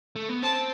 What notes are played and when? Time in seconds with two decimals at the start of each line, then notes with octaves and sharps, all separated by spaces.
0.16 A3
0.29 B3
0.43 C4 A5